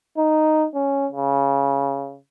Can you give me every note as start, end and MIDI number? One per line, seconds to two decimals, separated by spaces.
0.17 0.66 63
0.74 1.06 61
1.12 2.17 49